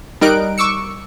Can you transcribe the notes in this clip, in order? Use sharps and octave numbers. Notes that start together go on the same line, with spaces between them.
G3 D#4 A#4 F#6 D7
C#6 D6 E6 C#7